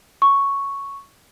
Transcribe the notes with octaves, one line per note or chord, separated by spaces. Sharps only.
C#6